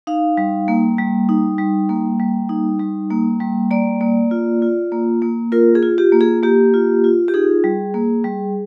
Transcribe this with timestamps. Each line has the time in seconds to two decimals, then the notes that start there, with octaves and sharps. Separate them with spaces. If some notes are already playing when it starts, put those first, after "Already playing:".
0.07 D#4 F5
0.37 G3
0.68 A#3
0.98 G3
1.29 D#4
1.58 G3
1.89 A#3
2.19 G3
2.49 D#4
2.80 G3
3.11 A#3
3.40 G3
3.71 A#3 D5
4.01 A#3
4.31 F4
4.62 F4
4.92 A#3
5.22 A#3
5.52 F4 A#4
5.75 G#4
5.83 F4
5.98 G4
6.12 A#3
6.21 G#4
6.43 A#3 G4
6.74 F4
7.04 F4
7.28 G4
7.34 D#4 G#4
7.64 G3
7.94 A#3
8.24 G3